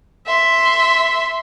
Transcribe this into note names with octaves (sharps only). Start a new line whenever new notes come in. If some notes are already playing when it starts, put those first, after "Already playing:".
E5 C6